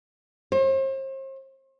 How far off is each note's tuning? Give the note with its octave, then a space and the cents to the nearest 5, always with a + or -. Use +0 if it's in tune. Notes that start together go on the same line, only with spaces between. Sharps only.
C5 +40